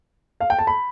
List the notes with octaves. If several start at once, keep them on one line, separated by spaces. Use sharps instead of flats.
F5
G5
A5
B5